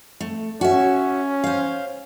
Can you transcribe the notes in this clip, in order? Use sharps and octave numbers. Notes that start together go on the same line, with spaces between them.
A3
C#4 F#4 E5
C5 F5